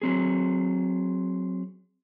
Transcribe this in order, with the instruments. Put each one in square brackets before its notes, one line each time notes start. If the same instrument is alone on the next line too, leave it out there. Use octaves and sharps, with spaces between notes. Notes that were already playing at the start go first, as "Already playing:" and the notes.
[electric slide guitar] F#3 C4 G#4